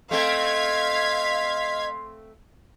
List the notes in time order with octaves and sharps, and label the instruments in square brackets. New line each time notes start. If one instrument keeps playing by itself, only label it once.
[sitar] A3 C4 A4 [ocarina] D#5 [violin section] F5 G#6 B6 [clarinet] C6